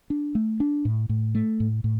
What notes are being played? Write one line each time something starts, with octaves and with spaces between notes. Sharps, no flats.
D4
A3
D4
A2
A2
A3
A2
A2